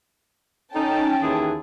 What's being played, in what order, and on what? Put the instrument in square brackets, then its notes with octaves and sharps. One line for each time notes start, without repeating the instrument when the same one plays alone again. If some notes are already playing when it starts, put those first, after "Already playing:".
[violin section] C#4 G5 A5 [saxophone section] D#4 A4
[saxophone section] D#2 E3 G#4